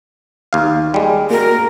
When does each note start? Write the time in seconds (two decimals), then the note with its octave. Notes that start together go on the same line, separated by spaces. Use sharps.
0.53 D#2 F5
0.94 G3 G#3
1.30 A#3 F#4 A#4